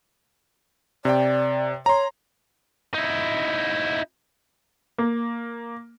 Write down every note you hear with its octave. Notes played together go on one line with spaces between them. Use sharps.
C3 D5 G5
C#5 A#5 C6
D#4 E4
A#3